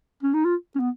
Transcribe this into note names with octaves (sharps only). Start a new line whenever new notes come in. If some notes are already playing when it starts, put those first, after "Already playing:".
C#4
D#4
F4
C#4
B3